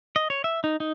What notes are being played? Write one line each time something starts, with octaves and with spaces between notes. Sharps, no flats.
D#5
C#5
E5
D#4
D#4